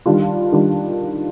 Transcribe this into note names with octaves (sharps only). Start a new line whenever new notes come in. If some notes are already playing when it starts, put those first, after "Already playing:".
D#3 G3 D4 F4
D#3 G3 D4 F4